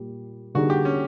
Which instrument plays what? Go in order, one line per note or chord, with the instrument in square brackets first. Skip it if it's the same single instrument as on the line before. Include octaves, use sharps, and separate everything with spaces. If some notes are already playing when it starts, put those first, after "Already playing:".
Already playing: [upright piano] A#2 G3
[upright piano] D3 G3 A#3 D#4 G#4 [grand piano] F#4
[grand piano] G4
C#4